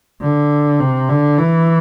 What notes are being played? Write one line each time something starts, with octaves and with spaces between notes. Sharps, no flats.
D3
C3
D3
E3